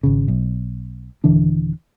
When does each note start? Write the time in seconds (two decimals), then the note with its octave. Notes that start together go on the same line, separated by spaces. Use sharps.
0.03 G#1 C#3
0.28 B1
1.24 D#1 D3 E3 D4